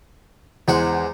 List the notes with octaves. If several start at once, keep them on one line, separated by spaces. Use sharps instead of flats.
E2 G#3 C5 F#5